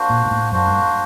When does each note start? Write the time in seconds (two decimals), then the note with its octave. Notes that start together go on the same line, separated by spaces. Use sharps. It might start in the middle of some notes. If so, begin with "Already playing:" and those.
Already playing: A#3 D4 F#4 C5
0.10 A#2
0.26 A#2
0.31 A2
0.52 F#2 A#3 D4 F#4 C5
0.67 G2